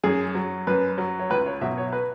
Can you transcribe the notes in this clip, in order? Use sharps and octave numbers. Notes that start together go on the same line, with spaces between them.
F#2 G#4
F#3
F#2 B4
F#3
C#5
C#2 B4
C#5
B2 F#3 E5
C#5
B4